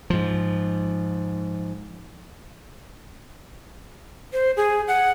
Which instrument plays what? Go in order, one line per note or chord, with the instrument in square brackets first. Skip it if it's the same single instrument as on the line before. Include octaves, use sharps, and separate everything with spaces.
[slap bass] G#2 F3
[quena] C5
G#4
F#5